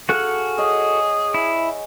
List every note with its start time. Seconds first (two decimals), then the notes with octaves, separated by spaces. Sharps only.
0.09 F#4 G#4 A4 F5 G#5 F#6
0.58 G#4 C#5 D#5 F#5
1.34 E4